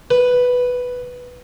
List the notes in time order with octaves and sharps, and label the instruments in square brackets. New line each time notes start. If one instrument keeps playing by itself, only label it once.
[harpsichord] B4